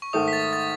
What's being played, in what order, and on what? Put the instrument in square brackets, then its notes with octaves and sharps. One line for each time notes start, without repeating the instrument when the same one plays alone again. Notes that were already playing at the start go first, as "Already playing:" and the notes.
[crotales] C#6
[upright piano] G#2 D#3 A3 [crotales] D#6
[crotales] B6
A6
A6